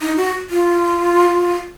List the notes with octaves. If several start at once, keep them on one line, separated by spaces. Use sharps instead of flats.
D#4
F#4
F4